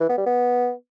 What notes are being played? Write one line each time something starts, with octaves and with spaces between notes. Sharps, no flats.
E3
B3
G3
B3